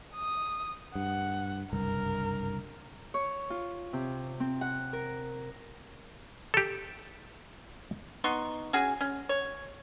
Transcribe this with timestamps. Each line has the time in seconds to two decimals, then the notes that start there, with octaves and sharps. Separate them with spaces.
0.15 D#6
0.95 G2 F#5
1.73 F#1 C2 G2 A#4
3.14 C#5
3.50 F4
3.93 C3
4.40 C4
4.61 F#5
4.93 A#4
6.54 G4 A4
8.24 B3 D#4 C6 C#6
8.73 C#4 F#4 G#4
9.01 C#4
9.29 C#5